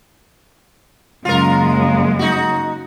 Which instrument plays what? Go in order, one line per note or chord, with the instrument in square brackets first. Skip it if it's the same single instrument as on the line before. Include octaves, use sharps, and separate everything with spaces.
[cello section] F#2 C#3 A#3 [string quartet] G#3 [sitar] F4 A#4
[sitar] D#4 F#4